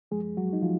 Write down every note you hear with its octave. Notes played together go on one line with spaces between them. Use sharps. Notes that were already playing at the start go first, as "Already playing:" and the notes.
F#2 F3 G#3 G#4
F#3 F#4
D#4
F3 F4